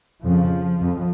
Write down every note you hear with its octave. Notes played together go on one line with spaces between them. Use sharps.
F2 C#3 F3
F2